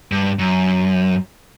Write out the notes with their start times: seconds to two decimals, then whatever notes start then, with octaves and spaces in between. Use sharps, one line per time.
0.12 G2
0.39 F#2